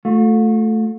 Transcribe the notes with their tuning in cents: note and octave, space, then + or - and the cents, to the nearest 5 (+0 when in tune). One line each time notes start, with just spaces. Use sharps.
A3 +0 F4 +45